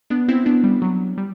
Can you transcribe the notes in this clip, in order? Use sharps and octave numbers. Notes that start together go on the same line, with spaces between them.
B3 D4
C4 E4
B3 D4
G3
F#3
G3